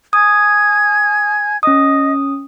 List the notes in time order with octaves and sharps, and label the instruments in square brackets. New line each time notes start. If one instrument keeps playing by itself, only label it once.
[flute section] G#5 G#6 [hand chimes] D#6
[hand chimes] C#4 D#6 [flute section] D#5